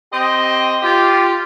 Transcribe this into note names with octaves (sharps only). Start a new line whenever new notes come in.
C4 G4 C5 D#5
F4 G4